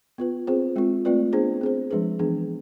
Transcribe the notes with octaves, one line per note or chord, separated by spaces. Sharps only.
B3 F4 B4
C4 F4 G#4 C5
G#3 C4 F4
A3 C4 F4 B4 D5
B3 D4 G#4 C5
C4 G#4 C5
F3 G#3 D4 G#4 B4
E3 B3 D4 G#4